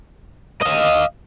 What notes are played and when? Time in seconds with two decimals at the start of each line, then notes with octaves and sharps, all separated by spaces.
0.62 D#5 F5